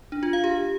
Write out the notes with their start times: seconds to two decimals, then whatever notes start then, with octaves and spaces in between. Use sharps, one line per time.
0.12 D4
0.23 F4
0.33 F5
0.44 G4